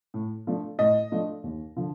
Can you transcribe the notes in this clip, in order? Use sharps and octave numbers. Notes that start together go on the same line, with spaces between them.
A2
F3 A3 D4
A2 D#5
F3 A3 D4
D#2
D3 F3